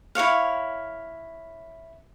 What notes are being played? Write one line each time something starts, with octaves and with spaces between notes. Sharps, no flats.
E4 F#4 C#5 F5